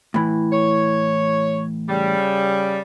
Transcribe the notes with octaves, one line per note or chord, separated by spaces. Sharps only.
A2 E3
C#5
C#3 G3